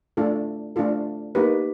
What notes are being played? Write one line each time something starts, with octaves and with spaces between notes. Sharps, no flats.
A3 D4 F4 A4
A3 D4 F4 A4
A#3 D#4 G4 B4